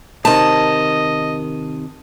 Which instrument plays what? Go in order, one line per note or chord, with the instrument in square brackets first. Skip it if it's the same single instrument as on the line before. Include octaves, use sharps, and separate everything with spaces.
[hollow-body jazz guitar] C3 D#3 [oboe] D#5 [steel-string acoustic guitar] A5